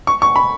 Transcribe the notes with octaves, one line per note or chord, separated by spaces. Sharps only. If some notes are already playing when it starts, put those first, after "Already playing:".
C#6
C#6
B5